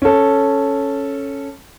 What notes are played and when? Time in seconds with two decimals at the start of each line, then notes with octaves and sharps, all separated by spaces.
0.02 C#4 A4